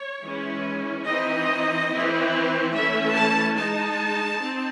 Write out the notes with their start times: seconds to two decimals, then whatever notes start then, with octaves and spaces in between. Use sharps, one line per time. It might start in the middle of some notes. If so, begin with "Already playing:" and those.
Already playing: C#5
0.21 E3 G#3 C#4 E4
1.05 E3 C4 D#4 D#5
1.88 E3 C4 E4
2.72 E3 A3 C#4 E5
3.13 A5
3.55 G#3 D#4 A5
4.39 C4 D#4